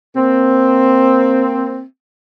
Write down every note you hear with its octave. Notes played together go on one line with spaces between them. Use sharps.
A#3 C4